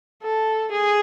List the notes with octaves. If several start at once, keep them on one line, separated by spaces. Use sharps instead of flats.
A4
G#4